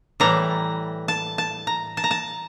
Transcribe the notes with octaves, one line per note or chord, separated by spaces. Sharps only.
A2 E3 G3 A#5
A5
A5
A#5
A5
A#5
A5